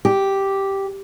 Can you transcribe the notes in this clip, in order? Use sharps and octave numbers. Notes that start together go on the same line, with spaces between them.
G4